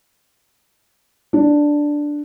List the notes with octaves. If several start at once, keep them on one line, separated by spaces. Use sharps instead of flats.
D4